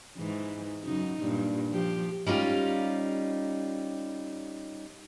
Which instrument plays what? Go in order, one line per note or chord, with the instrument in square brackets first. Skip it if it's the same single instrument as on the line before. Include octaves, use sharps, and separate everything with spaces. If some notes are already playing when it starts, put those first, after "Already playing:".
[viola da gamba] G#2 E3
F#2 C#3 D#4
G2 A#2
F3 G4
[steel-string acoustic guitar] G3 C#4 D#4 F4 G4